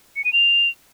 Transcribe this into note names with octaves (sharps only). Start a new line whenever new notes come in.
C#7
D#7
F7